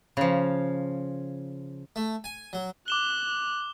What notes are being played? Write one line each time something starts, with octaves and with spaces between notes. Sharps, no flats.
C#3 F3
A3
G#5
F#3
D6 F#6 E7 G7